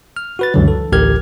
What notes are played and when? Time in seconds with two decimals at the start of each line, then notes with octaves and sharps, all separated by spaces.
0.16 F6
0.39 F#4 B4 A6
0.54 C#2 F#2 D3 E3 F#3
0.68 A4
0.92 A1 D2 G4 A#4 F6 G#6